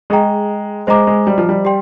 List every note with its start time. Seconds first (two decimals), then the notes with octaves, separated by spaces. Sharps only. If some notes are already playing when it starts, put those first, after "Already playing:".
0.10 G#3 G#4 D#5 G5 A#5
0.87 G#3 C5 D#5 A#5 D6
1.07 G#3
1.27 G3
1.38 F3
1.49 G3
1.65 G4 D5 G5 C6